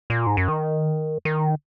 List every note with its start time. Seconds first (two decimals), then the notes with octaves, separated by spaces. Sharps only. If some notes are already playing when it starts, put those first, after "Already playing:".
0.10 A#2
0.27 G#2
0.37 F#2
0.48 D#3
1.25 D#3